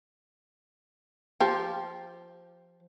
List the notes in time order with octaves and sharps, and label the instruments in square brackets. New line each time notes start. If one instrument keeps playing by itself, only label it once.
[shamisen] F3 G4